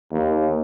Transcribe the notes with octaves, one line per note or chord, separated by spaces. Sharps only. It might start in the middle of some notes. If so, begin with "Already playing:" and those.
D#2